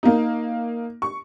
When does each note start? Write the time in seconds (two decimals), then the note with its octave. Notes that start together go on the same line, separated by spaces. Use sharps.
0.03 A#3 D#4
1.02 C#6